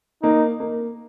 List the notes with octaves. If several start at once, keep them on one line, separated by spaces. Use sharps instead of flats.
A#3 D#4
A#3